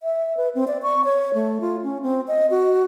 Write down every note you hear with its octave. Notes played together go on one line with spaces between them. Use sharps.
E5
B4
C4
D5
C#6
C#5
A3
F4
C#4
C4
D#5
F#4